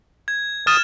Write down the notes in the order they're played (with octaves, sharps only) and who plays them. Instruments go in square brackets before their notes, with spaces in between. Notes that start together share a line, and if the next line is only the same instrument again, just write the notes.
[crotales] G#6
[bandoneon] D#6 [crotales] F6 A6 E7